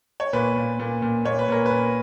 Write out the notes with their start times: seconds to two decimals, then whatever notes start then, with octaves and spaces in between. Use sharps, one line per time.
0.20 C#5
0.33 A#2 B4
0.56 A#2
0.79 A#2
1.02 A#2
1.25 A#2 C#5
1.39 B4
1.48 A#2 A#4
1.66 A#2 B4